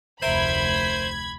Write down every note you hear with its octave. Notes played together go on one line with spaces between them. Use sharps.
F1 D2 A#4 C5 E5 G#5 B5 G#6